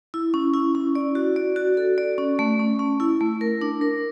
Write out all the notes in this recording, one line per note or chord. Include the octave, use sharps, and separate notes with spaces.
E4
C#4
E4
C#4
D5
F#4
D5
F#4
A4
D5
C#4
A3
C#4
C#4
E4
A3
A#4
D4
A#4